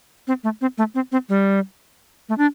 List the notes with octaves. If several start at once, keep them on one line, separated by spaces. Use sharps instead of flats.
C4
A3
C4
A3
C4
C4
G3
A3
D4